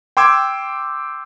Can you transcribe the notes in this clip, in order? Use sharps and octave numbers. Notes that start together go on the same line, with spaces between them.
G5 C6 D6 E6 G#6